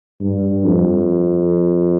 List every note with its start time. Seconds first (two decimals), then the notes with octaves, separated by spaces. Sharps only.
0.21 G2
0.65 F2